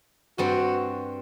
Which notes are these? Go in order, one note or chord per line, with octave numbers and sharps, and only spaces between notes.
G2 G3 C4 F#4